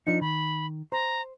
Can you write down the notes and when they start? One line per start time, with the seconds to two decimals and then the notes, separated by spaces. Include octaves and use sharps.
0.07 F3 D4 D#4 C#7
0.21 D#3 B5
0.92 C5 A#5